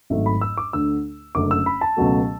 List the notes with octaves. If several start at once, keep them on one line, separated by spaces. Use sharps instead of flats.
G#1 G#2 F#3 A3 E5
B5
E6
D6
D2 D3 A3 E6
F#1 F#2 D3 A3 D6
E6
B5
A5
C#2 B2 F#3 A3